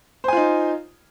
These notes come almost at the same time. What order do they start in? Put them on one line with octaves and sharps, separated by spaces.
C5 G#5 F4 D#4